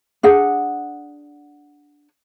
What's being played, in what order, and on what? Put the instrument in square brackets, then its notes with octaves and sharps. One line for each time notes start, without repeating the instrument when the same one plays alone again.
[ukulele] D4 G#4 F#5